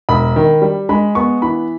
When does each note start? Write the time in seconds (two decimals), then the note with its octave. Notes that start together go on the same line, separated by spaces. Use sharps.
0.09 E1 B5
0.36 D#3
0.62 G3
0.89 G#3 B5
1.15 B3 C#6
1.42 E3 B5